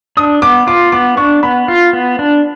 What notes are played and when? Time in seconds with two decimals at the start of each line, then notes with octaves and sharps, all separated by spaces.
0.17 D4 D#6
0.42 B3 D6
0.67 F4 D6
0.92 B3 D6
1.17 D4 C#6
1.43 B3 B5
1.68 F4
1.93 B3
2.19 D4